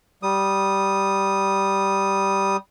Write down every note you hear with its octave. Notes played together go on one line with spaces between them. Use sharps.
G3 D#6